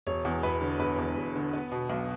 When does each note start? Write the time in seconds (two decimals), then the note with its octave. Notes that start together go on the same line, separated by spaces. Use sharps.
0.07 E1 C#5
0.25 E2
0.43 E1 B4
0.61 D3
0.80 E1 B4
0.98 E2
1.17 E1
1.36 D3
1.53 B3
1.72 B2
1.90 B1